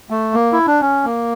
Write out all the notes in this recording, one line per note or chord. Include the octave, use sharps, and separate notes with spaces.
A3
A#3
E4
D4
C#4
A#3